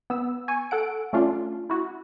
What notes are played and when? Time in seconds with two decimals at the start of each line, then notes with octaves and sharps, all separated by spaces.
0.10 B3 E6
0.48 G#5 C#6
0.71 A4 F#5 D7
1.13 A3 C#4 D4 F4
1.70 E4 F#4